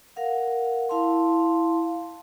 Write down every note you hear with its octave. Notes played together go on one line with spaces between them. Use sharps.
A#4 F5 F#5
E4 F5 A5 C6